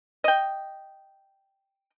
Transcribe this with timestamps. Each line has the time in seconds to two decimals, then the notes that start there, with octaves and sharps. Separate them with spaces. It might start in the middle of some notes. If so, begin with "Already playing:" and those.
0.24 D#5 G5